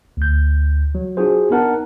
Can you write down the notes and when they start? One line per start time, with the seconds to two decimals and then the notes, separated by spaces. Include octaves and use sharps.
0.17 D2 G6
0.95 F#3
1.17 D4 F4 F#4 G#4 C5
1.50 B3 D#4 A#4 F#5 A5